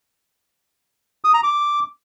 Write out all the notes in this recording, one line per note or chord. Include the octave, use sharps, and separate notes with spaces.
D#6
A#5
D6